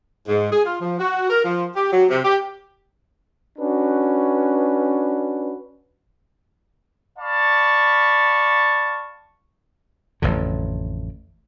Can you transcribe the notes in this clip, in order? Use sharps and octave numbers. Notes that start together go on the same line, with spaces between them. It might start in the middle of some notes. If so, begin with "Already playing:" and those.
G#2
G#4
F4
F3
F#4
A#4
F3
G4
F#3
C3
G4
C#4 D4 F#4 B4
D5 F5 A5 B5 C#6
A1 F2 D3